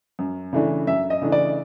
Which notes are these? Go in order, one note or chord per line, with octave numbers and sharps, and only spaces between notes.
F#2
C#3 E3 A3 D4
F#2 E5
D#5
C#3 E3 A3 D4
D5